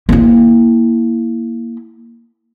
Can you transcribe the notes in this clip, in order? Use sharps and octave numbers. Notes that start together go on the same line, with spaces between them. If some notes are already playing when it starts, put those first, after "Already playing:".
A#3 E4